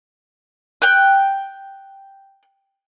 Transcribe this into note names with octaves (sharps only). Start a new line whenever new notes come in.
G5 F#6